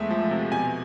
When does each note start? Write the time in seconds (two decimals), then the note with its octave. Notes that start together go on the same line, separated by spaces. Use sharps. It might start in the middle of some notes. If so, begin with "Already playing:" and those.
Already playing: E2 G#3 A3 E5
0.10 F3
0.31 C3
0.52 B2 G#5